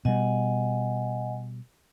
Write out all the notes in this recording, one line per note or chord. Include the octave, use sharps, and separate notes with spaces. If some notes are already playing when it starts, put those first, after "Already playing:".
B2 G3 D#5 F#5 G#5